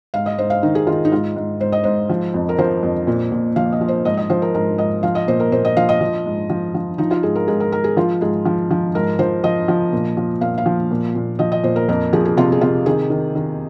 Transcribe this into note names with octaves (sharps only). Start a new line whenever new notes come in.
G#2 F5
D#5
G#2 C5
F5
D#3 D#4
G#4
D#3 F4
D#4
G#2 F4
G#2
G#2 C5
D#5
G#2 C5
F3
F2
A#4
F3 C5
F2
A#2
A#2
F3 F5
D#5
F3
C5
G#2 D#5
D#5
F3 C5
A#4
G#2 A#4
G#2 D#5
F3 F5
D#5
A#2 C5
A#4
A#2 C5
D#5
F3 F5
D#5
F3
G#2
F3
F3
F3 D#4
F4
G#2 G#4
A#4
G#2 G#4
A#4
G#2 A#4
G#4
F3 F4
G#2 G#4
F3
F3
G#2 A#4
F3 C5
F3 D#5
F3
A#2
F3
A#2 F5
F5
F3
A#2
A#2
F3 D#5
D#5
A#2 C5
A#4
F2 A#4
F3 G#4
G#4
C3 F4
G#4
C3 F4
D#3 G#4
D#3
D#3